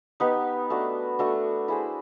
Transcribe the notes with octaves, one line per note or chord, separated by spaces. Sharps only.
B3 D#4 G4 B4
A3 D4 F#4
A3 D4 F#4
E4 G#4 C5